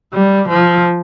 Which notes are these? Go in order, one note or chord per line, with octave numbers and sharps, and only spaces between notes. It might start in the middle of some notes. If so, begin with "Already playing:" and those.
G3
F3